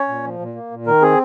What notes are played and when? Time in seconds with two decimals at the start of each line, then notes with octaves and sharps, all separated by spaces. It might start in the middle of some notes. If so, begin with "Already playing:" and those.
Already playing: C#4 C#5
0.08 A#2
0.24 F3
0.39 A#2
0.55 A#3
0.71 A#2
0.86 D#3 A#4
1.02 C4 G#4